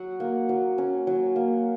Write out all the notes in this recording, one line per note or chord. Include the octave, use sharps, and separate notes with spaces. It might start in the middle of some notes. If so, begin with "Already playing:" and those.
Already playing: F#3 F#4 F#5
A#3
F#3
C#4
F#3
A#3